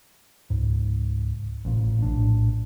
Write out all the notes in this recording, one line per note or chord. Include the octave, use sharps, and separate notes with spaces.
C#2 G#2
A1 A#2
A#1 A2 D4